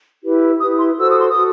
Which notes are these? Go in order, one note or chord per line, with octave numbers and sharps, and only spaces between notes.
E4 G4 B4
E4 G4 B4 D#6
C6
F#4 A4 C5 E6
D#6
C6
D#6
F#4 A4